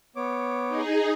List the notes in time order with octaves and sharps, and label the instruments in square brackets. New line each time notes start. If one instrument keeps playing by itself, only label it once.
[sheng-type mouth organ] B3 C#5 D6
[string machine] D#4 G#4